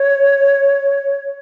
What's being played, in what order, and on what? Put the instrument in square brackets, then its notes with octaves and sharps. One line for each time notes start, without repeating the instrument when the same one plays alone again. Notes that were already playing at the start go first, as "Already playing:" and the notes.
Already playing: [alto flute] C#5